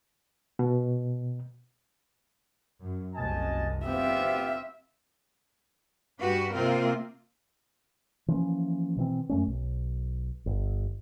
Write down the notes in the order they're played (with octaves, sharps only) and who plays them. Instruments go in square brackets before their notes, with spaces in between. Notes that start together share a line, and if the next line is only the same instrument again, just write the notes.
[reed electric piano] B2
[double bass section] F#2
[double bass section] F#1 C2 [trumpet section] D#5 G#5 A5
[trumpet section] B3 F4 G4 [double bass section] C4 [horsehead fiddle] E5
[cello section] G2 F#4 G4 B4
C3 A#3 C4 F4 A#4
[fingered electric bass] E3 F3 A#3 C#4
B2 E3 C4
F#2 A3 C#4
B1
G1